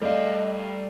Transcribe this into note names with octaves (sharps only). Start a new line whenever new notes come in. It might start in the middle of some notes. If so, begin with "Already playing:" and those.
G3 A3 D5 D#5 F5